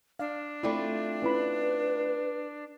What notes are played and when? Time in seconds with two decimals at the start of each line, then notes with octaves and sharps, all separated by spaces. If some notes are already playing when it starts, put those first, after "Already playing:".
0.19 D4 F5
0.63 A3 C4 E4 F4 D5 B5
1.22 C#4 E4 B4 B5